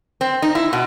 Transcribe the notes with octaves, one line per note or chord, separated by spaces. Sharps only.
C4
D#4
E4
B2